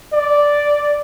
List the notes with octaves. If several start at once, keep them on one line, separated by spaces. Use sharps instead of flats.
D5